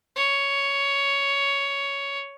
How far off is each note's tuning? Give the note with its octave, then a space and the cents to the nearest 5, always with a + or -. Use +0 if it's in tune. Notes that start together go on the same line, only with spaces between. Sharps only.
C#5 +10